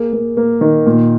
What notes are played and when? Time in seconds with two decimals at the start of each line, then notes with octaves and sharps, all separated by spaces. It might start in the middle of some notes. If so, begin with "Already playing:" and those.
Already playing: A#3 G#4
0.13 A#3
0.37 A#3
0.61 D#3
0.86 A#2